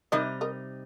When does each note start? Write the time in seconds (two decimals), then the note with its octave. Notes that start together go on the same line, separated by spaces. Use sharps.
0.12 C3 G3 D#4 A#4 D#5
0.41 A#4 D#5